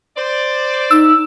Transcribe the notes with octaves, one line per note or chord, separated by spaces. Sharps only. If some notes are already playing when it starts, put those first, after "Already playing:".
C5 D5
D#4 E6